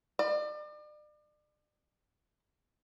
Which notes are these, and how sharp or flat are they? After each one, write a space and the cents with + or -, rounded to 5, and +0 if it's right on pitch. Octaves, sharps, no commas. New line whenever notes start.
D5 +40